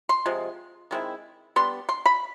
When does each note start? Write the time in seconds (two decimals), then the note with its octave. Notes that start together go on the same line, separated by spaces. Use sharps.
0.09 C6
0.26 C3 F3 G#3
0.91 D#3 G#3 C4 E4
1.56 G3 B3 D4 C6
1.89 C6
2.06 B5